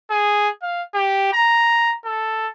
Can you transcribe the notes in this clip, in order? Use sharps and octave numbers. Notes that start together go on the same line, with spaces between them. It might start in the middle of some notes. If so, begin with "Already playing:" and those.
G#4
F5
G4
A#5
A4